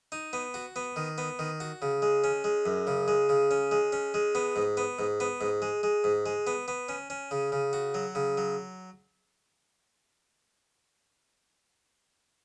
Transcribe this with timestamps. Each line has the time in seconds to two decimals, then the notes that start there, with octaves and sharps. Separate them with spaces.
0.12 D#4
0.33 B3
0.54 F#4
0.76 B3
0.96 D#3
1.18 B3
1.39 D#3
1.60 F#4
1.82 C#3
2.02 G#3
2.24 C#4
2.44 G#3
2.66 F#2
2.87 C#3
3.08 G#3
3.29 C#3
3.51 C#4
3.71 G#3
3.92 C#4
4.14 G#3
4.35 B3
4.56 G#2
4.77 B3
4.99 G#2
5.20 B3
5.41 G#2
5.62 G#3
5.83 G#3
6.04 G#2
6.26 G#3
6.47 B3
6.68 B3
6.89 C#4
7.10 C#4
7.31 C#3
7.52 C#3
7.73 F#4
7.94 F#3
8.15 C#3
8.37 F#3